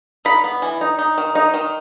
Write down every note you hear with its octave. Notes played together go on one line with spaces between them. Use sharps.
D#4 B5
B3
E3
D#4
D#4
D#3
D#4
D#3